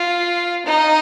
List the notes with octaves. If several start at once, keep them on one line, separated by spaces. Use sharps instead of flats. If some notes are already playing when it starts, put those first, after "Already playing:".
Already playing: F4
D#4